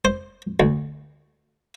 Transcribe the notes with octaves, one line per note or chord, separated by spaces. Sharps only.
C5
D2